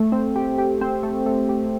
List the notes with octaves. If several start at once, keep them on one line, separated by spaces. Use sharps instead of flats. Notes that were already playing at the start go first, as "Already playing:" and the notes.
Already playing: A3
C4
G4
G4
C4
A3
A3
G4